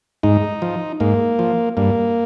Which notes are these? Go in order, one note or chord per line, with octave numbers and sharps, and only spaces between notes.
G#2 D#4
F3
G#2 A#3
F3
G2 A#3